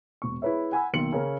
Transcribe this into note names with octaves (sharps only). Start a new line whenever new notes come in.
E1 C#6
E4 G#4 B4 C#5 E5
F#5 G#5 B5 E6
B1 D#3 A#3 C6 C#7 F#7
C#3 C#4 A#4